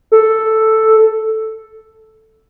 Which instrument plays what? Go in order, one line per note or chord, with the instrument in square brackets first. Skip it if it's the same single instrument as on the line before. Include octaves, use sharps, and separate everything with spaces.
[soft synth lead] A4